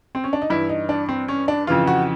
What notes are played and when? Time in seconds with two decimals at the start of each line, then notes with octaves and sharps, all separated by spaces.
0.15 C4
0.24 C#4
0.33 D4
0.42 D#4
0.50 G2 E3 E4
0.69 D#4
0.89 D4
1.09 C4
1.28 C#4
1.48 D4
1.67 F2 C#3 E3 F4
1.87 F#4